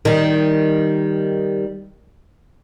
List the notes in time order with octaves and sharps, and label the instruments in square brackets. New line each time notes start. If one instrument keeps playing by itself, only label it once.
[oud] D#3 G3